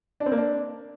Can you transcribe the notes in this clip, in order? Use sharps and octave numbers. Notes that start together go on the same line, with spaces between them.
D4
C4
A#3
D4